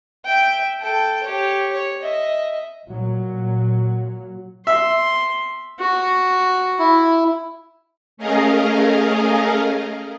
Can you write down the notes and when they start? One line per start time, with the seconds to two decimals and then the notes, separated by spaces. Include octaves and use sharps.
0.25 E5 G5
0.81 A4 G5
1.23 G4 C#5
1.73 C#5
2.02 D#5 E5
2.87 A#2 F#3
4.67 E5 C6
5.80 F#4
6.79 E4
8.17 A3 C#4 G#4 A#4 D#5 F5